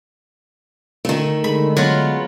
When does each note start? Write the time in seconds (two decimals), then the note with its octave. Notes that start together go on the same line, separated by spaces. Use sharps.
1.05 D3 D#3 A3
1.44 D3 G#3 B5
1.77 F#3 B3 F4